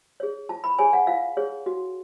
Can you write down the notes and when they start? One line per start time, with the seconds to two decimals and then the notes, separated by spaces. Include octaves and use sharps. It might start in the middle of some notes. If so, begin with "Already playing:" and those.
0.20 G#4 C#5
0.49 F4 A5
0.64 B5
0.79 G#4 C#5 G#5
0.93 F#5
1.07 F4 F5
1.37 G#4 C#5
1.66 F#4